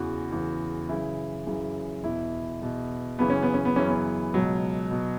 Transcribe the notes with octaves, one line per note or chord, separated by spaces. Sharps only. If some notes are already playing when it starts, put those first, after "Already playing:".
Already playing: E2 C#3 E3 F#4
E2 C#3 E3
F#2 C#3 E3 E4
F#2 C#3 E3
E2 B2 E4
E2 B2
F#2 C#3 E3 B3
C#4
B3
C#4
B3
F#2 C#3 E3 C#4
B3
C#2 B2 F#3
B2